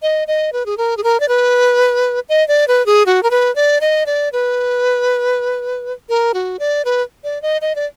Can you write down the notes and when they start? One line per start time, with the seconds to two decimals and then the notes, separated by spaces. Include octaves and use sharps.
0.02 D#5
0.28 D#5
0.53 B4
0.66 G#4
0.77 A#4
0.97 G#4
1.04 A#4
1.20 D5
1.29 B4
2.29 D#5
2.48 D5
2.68 B4
2.86 G#4
3.06 F#4
3.23 A#4
3.31 B4
3.56 D5
3.81 D#5
4.06 D5
4.33 B4
6.09 A#4
6.34 F#4
6.59 D5
6.85 B4
7.24 D5
7.42 D#5
7.62 D#5
7.76 D5